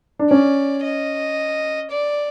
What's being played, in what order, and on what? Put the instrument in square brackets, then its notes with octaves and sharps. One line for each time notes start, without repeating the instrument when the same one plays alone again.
[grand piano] D4
[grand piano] C#4 [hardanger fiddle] D5
[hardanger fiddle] D#5
D5